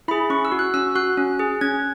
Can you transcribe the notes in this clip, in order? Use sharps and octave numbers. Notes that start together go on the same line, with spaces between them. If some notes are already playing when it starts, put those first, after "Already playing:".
E4 G#4 B5
C#4 C#6
E6
F#4
F#6
C#4 E6
F#4 F#6
C#4
G#4
C#4 G#6